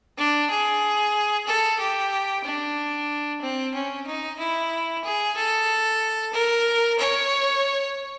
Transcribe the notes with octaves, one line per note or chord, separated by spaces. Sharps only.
D4
G#4
A4
G4
D4
C4
C#4
D#4
E4
G#4
A4
A#4
C#5